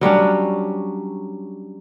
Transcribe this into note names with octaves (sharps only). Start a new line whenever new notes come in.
F#3 G3 C#4 D4